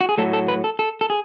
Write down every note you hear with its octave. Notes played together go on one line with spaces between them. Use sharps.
F#4
G#4
A2 F#3 A3 A4
A4
B4
A4
A4
A4
G#4